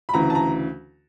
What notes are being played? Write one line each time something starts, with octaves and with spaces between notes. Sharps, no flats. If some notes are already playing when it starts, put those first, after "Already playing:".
B5
D2 C#3 E3 A#5
A5
A#5